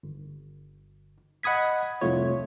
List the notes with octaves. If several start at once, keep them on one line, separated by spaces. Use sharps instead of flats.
G1
D#5 F#5 B5 D#6 G#6 B6
C2 F2 A3 F4 C#5